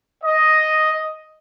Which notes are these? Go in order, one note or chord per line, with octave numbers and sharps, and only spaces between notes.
D#5